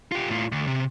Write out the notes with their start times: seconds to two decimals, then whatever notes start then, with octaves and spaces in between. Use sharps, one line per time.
0.12 F4 G4
0.29 A2 F4
0.52 D2
0.67 C3